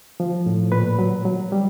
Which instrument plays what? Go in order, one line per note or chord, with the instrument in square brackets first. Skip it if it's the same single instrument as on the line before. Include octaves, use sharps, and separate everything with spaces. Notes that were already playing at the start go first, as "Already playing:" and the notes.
[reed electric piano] F3
A2
A#2 B4
F#3
F#3
G3